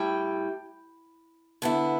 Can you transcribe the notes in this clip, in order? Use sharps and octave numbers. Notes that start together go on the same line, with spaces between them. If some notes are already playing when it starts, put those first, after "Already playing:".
Already playing: A2 G3 E4 G5
D3 B3 E4